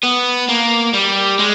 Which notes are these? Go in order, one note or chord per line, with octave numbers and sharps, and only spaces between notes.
B3
A#3
G3
G#3